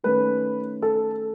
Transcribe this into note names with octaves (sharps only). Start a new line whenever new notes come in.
D#3 A3 C#4 B4
A4